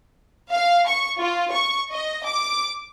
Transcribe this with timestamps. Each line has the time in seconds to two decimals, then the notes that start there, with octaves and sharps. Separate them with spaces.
0.52 F5
0.87 C#6
1.21 F4
1.54 C#6
1.92 D#5
2.26 D6